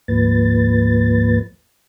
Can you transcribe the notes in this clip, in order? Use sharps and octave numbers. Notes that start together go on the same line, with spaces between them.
D2 G#2 F3 A#3 B4 A6